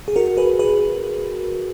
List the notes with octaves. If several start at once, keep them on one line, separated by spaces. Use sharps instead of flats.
G#4
F#4 A#4
G#4 B4
G#4 B4